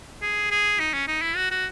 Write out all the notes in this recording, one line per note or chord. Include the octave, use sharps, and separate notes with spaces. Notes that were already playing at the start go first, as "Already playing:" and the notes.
G#4
G#4
D#4
C#4
D#4
E4
F#4
F#4